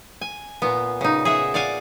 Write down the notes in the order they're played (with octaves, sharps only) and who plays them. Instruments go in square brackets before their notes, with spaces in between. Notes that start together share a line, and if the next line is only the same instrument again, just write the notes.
[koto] G#5
A#2 B3
C#3 D#4
G#4 E5 F#5
D5 F5 F#5 G#5